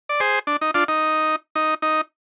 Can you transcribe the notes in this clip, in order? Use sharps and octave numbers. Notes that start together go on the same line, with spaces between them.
D5
G#4 C5
D4
D#4
D4 F4
D#4
D#4
D#4